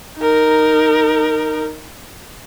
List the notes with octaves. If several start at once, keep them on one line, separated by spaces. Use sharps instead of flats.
D#4 A#4